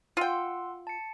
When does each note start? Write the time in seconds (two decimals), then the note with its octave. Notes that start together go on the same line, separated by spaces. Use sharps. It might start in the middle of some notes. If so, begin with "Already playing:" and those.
0.17 F4 F#5 G5 C6 E6
0.87 A5 C#7